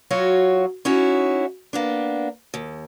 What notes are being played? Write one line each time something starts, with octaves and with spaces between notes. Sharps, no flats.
F#3 F4 F#4 C#5
C#4 D#4 E4 F#4
A#3 B3 D4
D#2